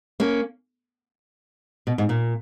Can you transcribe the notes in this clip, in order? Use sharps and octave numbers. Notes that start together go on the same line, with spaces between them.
A#3 C#4
B2
G#2
A#2